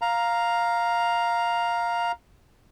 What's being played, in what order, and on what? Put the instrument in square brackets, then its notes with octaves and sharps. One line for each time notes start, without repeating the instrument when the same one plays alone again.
[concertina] F5 A#5